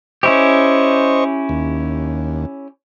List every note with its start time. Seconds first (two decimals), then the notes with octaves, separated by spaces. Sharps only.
0.23 C#4 E4 G4 C5 D#5 C#6
1.49 D#2